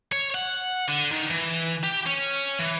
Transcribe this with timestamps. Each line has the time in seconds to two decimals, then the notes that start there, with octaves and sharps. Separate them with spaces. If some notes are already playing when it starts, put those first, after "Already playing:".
0.12 C#5
0.35 F#5
0.88 D3
1.11 D#3
1.31 E3
1.83 G4
2.06 C#4
2.59 E3